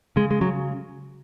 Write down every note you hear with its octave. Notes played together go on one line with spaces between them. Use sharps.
C#3 G#3
G#3
C#3 F#3